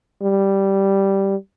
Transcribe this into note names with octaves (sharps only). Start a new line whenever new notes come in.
G3